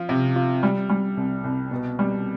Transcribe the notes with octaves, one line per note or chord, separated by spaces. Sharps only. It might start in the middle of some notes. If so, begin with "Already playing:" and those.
Already playing: F3 F4
C3
F4
G3
G3
C2
C2
B2
G3